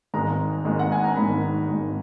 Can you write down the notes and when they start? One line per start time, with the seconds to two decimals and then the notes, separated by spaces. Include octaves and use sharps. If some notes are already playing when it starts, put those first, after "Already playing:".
0.14 G#1 G#2 D#3 G#3 A#5
0.65 G#1 G#2 D#3 G#3
0.79 F#5
0.92 G#5
1.04 A#5
1.16 G#1 G#2 D#3 G#3 B5
1.68 G#1 G#2 D#3 G#3